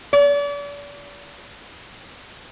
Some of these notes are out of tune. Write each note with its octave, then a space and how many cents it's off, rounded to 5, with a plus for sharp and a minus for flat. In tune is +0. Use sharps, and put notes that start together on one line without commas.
D5 -40